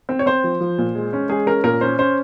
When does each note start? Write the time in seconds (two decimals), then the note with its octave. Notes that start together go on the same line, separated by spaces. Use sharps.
0.09 C4
0.19 C#5
0.26 C4 C5
0.44 F3
0.60 F3
0.78 A#2
0.95 G#3
1.13 C#4
1.29 G#3 G#4
1.46 C#4 A#4
1.64 A#2 A#4
1.81 C#4 C5
1.99 C#4 C5